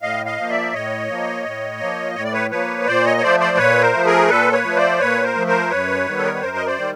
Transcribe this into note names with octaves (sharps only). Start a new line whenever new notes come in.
A2 D#5 F5
D#5 F5
F3 A#3
D5 E5
A2 C#5 D#5
F3 A#3
A2
F3 A#3
A2 C#5
D5
B4 C#5
F3 A#3 B4 C#5
A#2 C5 D5
C#5 D#5
C#5
F3 A3 C5 D5
C5 D5
A#2 B4 C#5
A#4 C5
F3 A3
G#4 A#4
A#2 A4 B4
B4 C#5
F3 A3
C5 D5
A#2 B4 C#5
A#4 C5
F3 A3
A#4 C5
F#2 B4 C#5
D#3 G3 B3
A4
A#4
B4
F#2 A#4 C5
D#5
C5 D5
D#3 G3